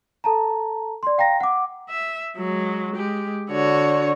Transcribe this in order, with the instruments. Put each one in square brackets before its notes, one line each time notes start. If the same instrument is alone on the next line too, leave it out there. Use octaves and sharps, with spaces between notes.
[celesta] A4 A5 A#5
D5 C6
F5 G5 A#5 A#6
F#5 D6
[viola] E5
F#3 G#3
G#3 G4
[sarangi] D3 [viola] F#4 C#5